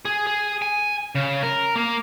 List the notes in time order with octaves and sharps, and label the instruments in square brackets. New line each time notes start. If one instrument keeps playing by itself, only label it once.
[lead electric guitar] G#4
G#4
G#5
C#3
A#4
A#3